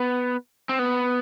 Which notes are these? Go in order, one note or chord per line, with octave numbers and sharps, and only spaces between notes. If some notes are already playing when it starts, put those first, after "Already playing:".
Already playing: B3
C4
B3